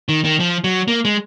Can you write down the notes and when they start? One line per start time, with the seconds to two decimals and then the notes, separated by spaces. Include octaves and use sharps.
0.09 D#3
0.24 D#3
0.40 F3
0.64 F#3
0.88 A#3
1.05 G#3